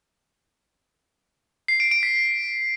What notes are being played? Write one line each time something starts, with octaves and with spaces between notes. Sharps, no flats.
C7
D7
D7
B6